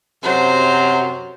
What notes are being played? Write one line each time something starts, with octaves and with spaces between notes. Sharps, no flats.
F#2 C3 F#3 C5